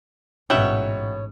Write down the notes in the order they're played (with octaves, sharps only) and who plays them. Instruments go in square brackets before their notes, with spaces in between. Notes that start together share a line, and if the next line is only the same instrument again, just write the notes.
[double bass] A1 G#2 [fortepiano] B2 [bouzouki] C#5 [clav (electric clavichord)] E5 F#5 G5